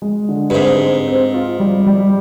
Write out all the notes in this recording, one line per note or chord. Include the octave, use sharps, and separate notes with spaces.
G#3
D3
G2
G#2 C4
C4
C4
F4
G3
G3